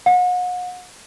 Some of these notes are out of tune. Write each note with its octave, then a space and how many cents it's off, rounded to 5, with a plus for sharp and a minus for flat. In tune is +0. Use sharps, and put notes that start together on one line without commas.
F#5 -40